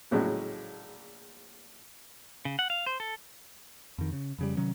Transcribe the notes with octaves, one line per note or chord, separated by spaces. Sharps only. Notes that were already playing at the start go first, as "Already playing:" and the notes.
A#1 A2 C#3 F#3 G#3
C#3
F#5
F5
C5
A4
F2 D#3
C#3
F2 C#3 G3
C3 D#3 F#3 C#4